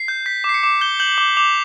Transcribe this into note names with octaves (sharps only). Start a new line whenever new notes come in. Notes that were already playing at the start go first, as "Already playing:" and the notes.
Already playing: C7
G6
G6 B6
D6 C7
C#7
D6
G6 G7
G6 F#7
D6 G7
D6 F7